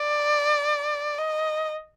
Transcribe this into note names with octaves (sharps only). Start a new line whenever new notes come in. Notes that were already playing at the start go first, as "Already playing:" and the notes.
Already playing: D5
D#5